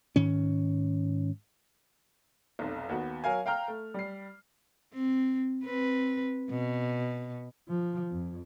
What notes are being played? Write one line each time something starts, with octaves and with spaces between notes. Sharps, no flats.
G#2 D#3 C#4
F1 B1
D#2 B3 F#4
F#3 A#4 F5 G#5
F5 G5 A#5 F6
A3
G3 C7
C4
C4 B4
B2
F3
F2